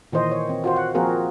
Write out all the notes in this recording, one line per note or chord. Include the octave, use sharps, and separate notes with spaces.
A#2 D#3 E3 C5 D#5
C#5
C4
F4 F#4 C5
F#5
F3 A#3 C4 F#4 G#4 A#4